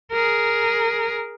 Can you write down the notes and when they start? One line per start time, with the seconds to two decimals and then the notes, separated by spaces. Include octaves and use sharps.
0.12 G#4 A#4